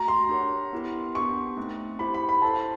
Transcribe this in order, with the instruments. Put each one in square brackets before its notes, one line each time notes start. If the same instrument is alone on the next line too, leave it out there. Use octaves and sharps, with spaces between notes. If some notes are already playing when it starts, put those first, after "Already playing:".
Already playing: [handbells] A3 F#4 [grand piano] A#5
[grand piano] C6
[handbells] D4 G4 A#4 C#5 F#5
B3 E4 G4 A#4
[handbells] B3 D4 G4 [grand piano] C#6
[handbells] A3 C4 D#4
[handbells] E4 G4 C5 [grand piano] B5
[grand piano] B5
B5
[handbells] E4 A4 C5 F5 [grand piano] A5